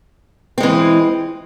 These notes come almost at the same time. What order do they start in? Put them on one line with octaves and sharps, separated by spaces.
C4 G#3 E3